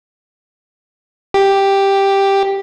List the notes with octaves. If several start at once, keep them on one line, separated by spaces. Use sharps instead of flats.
G4